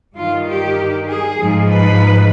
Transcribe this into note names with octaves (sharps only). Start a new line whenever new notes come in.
G2 D#3 F4
G4
G#4
G#2 F3
B4